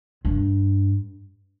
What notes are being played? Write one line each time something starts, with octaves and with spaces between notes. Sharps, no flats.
G2